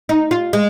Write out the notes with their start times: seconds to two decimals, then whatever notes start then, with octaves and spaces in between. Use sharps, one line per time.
0.09 D#4
0.31 F4
0.53 G#3